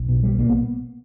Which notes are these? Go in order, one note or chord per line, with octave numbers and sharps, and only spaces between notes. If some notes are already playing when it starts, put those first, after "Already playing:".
Already playing: B1
B2
B2 G3
A#1 A#3
B3